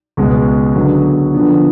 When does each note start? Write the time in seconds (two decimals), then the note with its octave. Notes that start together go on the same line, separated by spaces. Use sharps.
0.17 C#2 B2 G#3
0.75 D3 F#3 B3
1.33 D3 F3 B3 D4